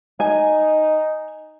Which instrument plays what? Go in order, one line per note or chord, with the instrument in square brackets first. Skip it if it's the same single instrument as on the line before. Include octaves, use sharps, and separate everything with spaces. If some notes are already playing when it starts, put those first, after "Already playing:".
[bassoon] D#4 [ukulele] G#5